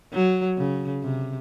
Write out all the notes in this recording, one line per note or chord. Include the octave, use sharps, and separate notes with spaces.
F#3
C#3
C3